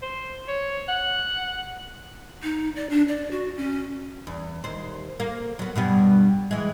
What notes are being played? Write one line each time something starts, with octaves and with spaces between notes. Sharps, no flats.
C5
C#5
F#5
D#4
D5
D4
D5
F#4
C#4
E2
D#2 C5
A#3
F#3 B3
G2 B2 B3
E3 G#3